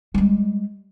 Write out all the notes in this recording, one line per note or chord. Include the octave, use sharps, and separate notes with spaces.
G3 G#3